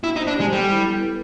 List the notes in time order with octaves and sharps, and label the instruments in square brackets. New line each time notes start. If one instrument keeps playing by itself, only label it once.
[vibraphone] D4 [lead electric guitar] E4
[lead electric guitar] D#4
[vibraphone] C5
[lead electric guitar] D4
[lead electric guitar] G#3 [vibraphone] G4
[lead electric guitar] G3 [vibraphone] A4
[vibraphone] E4
B3
B4